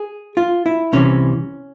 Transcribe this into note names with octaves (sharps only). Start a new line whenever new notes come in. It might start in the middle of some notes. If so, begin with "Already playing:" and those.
Already playing: G#4
F4
E4
C2 C3 E3 C#4